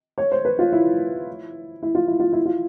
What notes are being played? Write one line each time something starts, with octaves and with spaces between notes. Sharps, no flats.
C#5
C5
B4
F4
E4
E4
F4
E4
F4
E4
F4